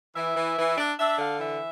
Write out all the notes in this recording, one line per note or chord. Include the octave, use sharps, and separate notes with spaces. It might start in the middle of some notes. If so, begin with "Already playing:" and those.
E3 E5
E3
E3
D4
D4 E5
D3 F5
E3 E5